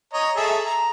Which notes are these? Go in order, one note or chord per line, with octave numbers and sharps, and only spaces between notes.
C#5 D#5 A#5
G#4 A4 E5
A#5